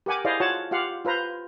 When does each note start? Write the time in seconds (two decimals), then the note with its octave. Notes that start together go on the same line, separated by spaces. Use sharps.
0.06 G4 A#4 F#5 G#5 D6
0.25 E4 G#4 C5 D5 D#5 F5
0.40 F4 F#4 C#5 F#5 A5
0.71 F4 G4 F5 F#5
1.05 F4 B4 C5 A#5